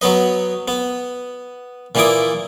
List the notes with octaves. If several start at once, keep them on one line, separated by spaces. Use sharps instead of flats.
F#3 B3 B4 D#5
B3
A#2 E3 A#3 E4 D6 D#6